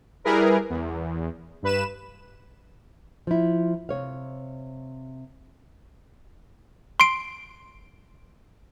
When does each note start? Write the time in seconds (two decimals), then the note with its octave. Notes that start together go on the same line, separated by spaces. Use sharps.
0.24 G3 E4 G#4 A#4 B4
0.70 E2
1.62 G2 B4 E7
3.27 F3 E4
3.89 C3 C#5 F5
7.00 C6 C7 D7